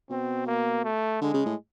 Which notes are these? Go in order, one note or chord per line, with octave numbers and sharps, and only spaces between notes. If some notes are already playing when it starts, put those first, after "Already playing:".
B2 C4
A#3
A3
D3 G#3
C#3
A2